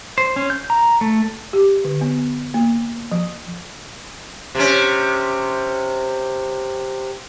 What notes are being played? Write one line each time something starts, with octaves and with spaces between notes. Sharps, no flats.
C5
C#4
G6
A#5
A3
G4
D3
B3
A#3
F3
C3 C#4